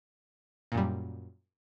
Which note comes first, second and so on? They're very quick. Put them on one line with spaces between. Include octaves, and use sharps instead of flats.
A#2 F#2 G3